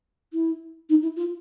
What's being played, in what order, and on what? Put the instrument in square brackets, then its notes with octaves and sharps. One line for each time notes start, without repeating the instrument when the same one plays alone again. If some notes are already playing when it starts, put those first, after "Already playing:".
[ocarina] E4
D#4
E4
F4